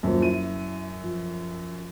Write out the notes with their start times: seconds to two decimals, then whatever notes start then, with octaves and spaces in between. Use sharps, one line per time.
0.03 D#1 F#2
0.22 E4 D#7
1.04 F3